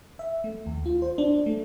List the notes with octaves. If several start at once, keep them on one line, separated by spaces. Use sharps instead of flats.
E5
A3
D#2
F4
C5
D4
A3